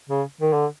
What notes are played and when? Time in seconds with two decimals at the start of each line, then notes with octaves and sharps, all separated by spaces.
0.10 C#3
0.41 D#3
0.53 D3